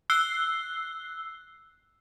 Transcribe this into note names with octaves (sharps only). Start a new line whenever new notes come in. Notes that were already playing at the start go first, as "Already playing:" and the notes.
E6 F#6 C7 G7